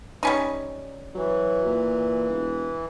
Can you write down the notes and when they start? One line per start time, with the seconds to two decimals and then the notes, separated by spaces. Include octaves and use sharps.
0.23 G3 C#4 D#4
1.15 E3 F#3
1.66 A#2
2.30 E1